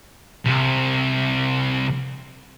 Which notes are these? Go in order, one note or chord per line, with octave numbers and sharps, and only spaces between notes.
C2 C3